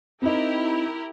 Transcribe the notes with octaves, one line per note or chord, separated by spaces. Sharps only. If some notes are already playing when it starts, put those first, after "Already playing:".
C4 D#4 E4 G4 A#4